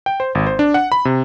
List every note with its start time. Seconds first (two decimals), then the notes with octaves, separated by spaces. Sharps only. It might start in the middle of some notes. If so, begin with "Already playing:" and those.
0.06 G5
0.20 C5
0.35 G#1
0.46 C5
0.59 D4
0.74 F#5
0.92 B5
1.05 C3